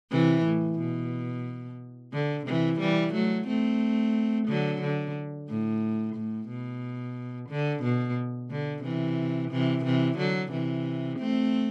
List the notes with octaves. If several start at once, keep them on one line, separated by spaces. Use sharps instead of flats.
C3 E3
A2
B2
D3
C3 E3
E3 G3
F#3 A3
A3 C4
D3 F#3
D3
A2
A2
B2
D3
B2
D3
C3 E3
C3 E3
C3 E3
D3 F#3
C3 E3
A3 C4